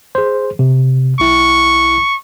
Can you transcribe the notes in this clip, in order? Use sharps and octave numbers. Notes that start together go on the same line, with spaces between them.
G#4 C5
C3
B1 E4 C#6